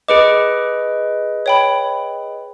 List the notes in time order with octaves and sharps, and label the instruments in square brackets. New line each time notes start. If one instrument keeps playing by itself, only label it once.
[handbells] G#4 B4 D#5 [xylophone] D6 C#7
[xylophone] C#5 G5 B5